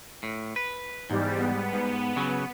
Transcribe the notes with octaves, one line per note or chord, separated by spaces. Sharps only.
A2
B4
E2 G#2 G3
B3
G#2
C#3 F#3